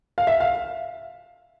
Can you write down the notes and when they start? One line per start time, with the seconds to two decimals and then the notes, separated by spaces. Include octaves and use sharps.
0.18 F5
0.27 E5
0.40 F5